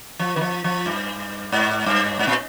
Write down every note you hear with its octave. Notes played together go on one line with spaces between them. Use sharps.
F3
D#3
F3
F3
G2
G#2
G2
G#2
A#2